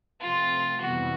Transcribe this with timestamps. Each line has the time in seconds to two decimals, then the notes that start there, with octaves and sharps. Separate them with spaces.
0.21 C3 F3 A3 C4 F4
0.81 F2 C3 E3 G3 B3 F#4